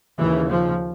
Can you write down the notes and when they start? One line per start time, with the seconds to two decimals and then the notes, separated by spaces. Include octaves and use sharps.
0.18 D#2 C#3 E3
0.49 F3